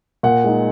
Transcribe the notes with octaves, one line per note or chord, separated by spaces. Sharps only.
A#2 F#5
G#3 D#4